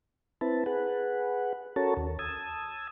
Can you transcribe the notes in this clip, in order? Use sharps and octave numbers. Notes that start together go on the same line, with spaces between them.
C4 E4 B4 A5
G#4 B4 F#5
C#4 F#4 A4 A#4 C#5 A5
D#2
A5 D#6 E6 G#6